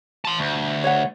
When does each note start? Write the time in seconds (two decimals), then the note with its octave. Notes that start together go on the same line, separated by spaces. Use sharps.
0.25 A5 C6
0.39 D2
0.84 C#5 F#5